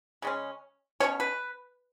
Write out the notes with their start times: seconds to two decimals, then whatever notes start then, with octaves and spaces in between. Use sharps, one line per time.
0.22 C#3 G#3 C#4
1.00 B2 A3 C#4 C#5
1.20 B4